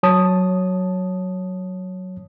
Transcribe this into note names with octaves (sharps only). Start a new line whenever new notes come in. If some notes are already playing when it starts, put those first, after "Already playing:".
F#3 C#5 A5 D#6